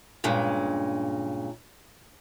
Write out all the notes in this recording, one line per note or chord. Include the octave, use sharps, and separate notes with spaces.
G2 A#2 C#3 G#3